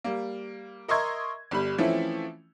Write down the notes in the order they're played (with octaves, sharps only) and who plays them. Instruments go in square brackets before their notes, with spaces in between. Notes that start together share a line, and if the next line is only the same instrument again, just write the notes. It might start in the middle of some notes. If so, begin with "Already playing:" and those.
[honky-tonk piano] G3 A#3
A#4 D#5 E5 C6 C#6 G#6
G1 G3 B5
E3 F3 A3 C4 C#4 E4